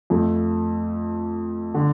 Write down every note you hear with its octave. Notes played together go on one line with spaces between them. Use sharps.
F2 F3 A3
D3